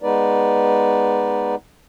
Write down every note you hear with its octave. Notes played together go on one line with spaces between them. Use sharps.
G#3 B3 D#4 B4 D5